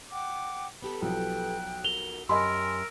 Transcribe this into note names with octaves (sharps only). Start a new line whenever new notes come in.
F#5 G5 D6
B3 G4 A4 B5
B1 F3 G5 F#6
A#4 F#5 F7 G7
F#2 G4 A#4 D#5 G#5 B5 C6 E6